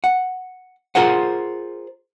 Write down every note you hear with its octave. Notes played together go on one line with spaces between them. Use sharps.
F#5
F4 G#4 A#4 C5 F#5